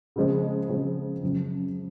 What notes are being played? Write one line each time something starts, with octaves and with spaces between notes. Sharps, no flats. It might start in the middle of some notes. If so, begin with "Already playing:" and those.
C#3 F3 G#3 C4
C#3 F3 G#3 C4
F#2 C#3 F3